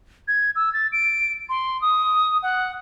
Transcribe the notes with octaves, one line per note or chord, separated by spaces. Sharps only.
G#6
E6
A6
D7
C6
D#6
F#5